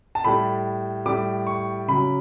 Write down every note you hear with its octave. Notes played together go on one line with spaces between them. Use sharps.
A5
A2 G3 B5
A2 G3 D6
C#6
C#3 F#3 B5